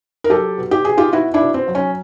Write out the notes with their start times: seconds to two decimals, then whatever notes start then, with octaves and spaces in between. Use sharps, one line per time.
0.24 A#4
0.30 F#3 G4 A4
0.58 B2
0.71 G4
0.85 B2 G#4
0.98 F4 G4
1.13 B2 E4 F#4
1.34 D4 E4
1.41 B2
1.54 C4
1.68 F#3
1.75 C#4